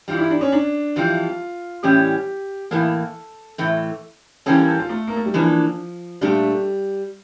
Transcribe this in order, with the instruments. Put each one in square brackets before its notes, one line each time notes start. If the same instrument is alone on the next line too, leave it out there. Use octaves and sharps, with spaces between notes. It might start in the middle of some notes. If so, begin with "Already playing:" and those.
[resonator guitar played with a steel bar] G2 E3 G3 [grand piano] F4
[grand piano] E4
D4
C#4
D4
[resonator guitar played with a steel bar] F2 E3 G3 [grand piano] F4
[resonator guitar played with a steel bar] A2 E3 G3 C#4 [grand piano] G4
[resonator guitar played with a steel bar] A2 E3 A#3 [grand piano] A4
[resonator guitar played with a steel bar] A2 E3 A3
[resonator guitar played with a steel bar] E3 G3 A#3 C#4 [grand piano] A4
[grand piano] A4
F4
A3
A#3
A3
G3
[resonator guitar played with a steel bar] E3 A#3 D4 [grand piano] F3
[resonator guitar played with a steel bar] A#2 A3 D4 [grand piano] G3